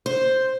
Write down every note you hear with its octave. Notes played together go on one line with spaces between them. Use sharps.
C5